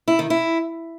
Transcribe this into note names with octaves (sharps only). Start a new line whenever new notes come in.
E4
D#3
E4